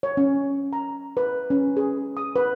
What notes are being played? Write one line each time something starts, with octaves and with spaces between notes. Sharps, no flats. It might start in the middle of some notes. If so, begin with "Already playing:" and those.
C#5
C#4
A#5
B4
C#4
G#4
D#6
B4